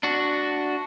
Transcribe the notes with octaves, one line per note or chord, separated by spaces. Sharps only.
D4 F#4